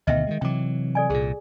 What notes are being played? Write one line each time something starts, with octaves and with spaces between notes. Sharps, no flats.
D2 B2 D#3 D#5 E5 G5
D#3 F#3 G#3
C3 E3 F#3 G5 D6
A4 D5 G#5
C2 A#2 G#4